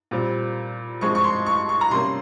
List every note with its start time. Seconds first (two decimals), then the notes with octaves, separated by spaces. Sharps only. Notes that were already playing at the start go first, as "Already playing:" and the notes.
0.11 A#2 G3 C4
1.01 G2 F3 G#3 C4 C#6
1.15 C#6
1.24 C6
1.46 C#6
1.69 C#6
1.81 A#5
1.91 C3 G3 A#3 C#4 C6